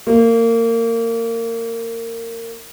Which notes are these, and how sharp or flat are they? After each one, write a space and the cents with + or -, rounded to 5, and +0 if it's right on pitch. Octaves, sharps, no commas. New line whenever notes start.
A#3 -25